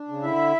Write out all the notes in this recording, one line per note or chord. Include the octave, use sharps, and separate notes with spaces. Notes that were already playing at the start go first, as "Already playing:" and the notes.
Already playing: D4
C#3
D3 E4 E5